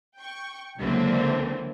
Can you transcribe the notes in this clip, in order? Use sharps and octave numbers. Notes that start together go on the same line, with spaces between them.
G5 C#6
C#2 D3 E3 F#3 A#3 C4